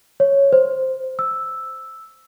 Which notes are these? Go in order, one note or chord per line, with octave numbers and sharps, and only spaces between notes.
C#5
C5
E6